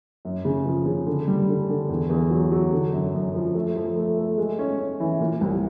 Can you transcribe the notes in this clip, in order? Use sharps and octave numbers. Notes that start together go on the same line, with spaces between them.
F#2
C#3
F3
C#3
D3
G3
D3
D3
E2
E2
F#3
F#3
D3
F#2
F#2
F3
A3
F3
A3
A3
G#3
C#4
C#4
E3
A#2
C2